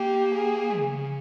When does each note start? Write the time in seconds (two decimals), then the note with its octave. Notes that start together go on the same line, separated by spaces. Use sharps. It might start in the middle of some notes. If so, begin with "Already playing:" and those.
Already playing: A#3 G4
0.35 G#4
0.79 C#3